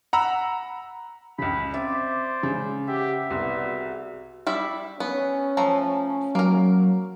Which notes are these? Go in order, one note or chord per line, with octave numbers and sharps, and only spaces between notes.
F#5 A#5 B5 E6
C#2 C#3 B5
C4 C5 D5 E5 D6
C#3 G#3 C#4
G4 E5 F#5
C2 B3 C6
F#4 G#4
G3 E4 E5
B3 C#4
F3 A3 A#5
F#3 A#3 A#4